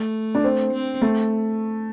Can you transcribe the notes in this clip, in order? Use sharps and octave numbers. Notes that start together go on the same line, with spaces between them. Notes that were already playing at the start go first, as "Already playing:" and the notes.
Already playing: A3
D4
C4
C4
A3